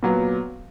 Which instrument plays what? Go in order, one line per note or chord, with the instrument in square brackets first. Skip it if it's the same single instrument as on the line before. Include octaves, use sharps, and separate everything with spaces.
[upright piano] A#2 F#3 B3